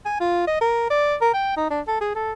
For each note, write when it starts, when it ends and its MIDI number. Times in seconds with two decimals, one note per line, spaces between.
0.06 0.20 80
0.20 0.46 65
0.47 0.60 75
0.61 0.86 70
0.90 1.15 74
1.21 1.30 70
1.34 1.54 79
1.57 1.68 63
1.70 1.81 62
1.88 2.00 69
2.01 2.12 68
2.15 2.32 69